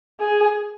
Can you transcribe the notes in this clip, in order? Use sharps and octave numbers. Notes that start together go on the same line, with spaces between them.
G#4